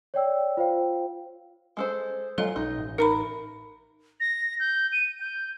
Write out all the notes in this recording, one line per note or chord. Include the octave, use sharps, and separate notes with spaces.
C#5 D5 G5 E6
F4 C5 F5 G5
G#3 A4 C5
F#3 G#3 F4 A4 D#5 F5
B1 D#4
A1
D#4 A#4 A#5 B5
A#6
G6
D#7
G6